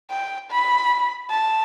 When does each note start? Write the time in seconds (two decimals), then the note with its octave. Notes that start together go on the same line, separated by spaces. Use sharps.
0.10 G5
0.51 B5
1.30 A5